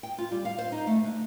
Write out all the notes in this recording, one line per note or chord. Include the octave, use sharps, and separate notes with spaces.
G5
F4
G3
F5
C5
D#4
A3
D3